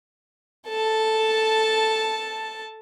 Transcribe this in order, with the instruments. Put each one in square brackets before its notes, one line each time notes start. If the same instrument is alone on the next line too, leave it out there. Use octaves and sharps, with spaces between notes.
[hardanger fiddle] A4 A5